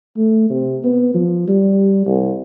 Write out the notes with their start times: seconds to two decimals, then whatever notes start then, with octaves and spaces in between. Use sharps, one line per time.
0.17 A3
0.50 C3
0.84 B3
1.14 F3
1.48 G3
2.06 C2